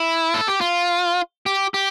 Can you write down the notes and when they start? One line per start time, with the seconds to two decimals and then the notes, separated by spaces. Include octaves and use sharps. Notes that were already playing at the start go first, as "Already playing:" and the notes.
Already playing: E4
0.34 A4
0.48 G4
0.61 F4
1.46 G4
1.74 G4